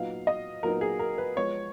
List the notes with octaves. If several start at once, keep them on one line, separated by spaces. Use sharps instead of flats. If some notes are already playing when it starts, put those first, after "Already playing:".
Already playing: A#2 F#3 B3 D#4 F5
D#5
A#2 F#3 B3 D#4 A#4
G#4
A#4
B4
F3 G#3 B3 C#5